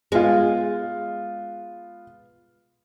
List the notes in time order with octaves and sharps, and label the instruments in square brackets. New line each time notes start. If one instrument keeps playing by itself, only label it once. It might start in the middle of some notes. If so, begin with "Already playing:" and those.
[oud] G#3 [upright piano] B3 F4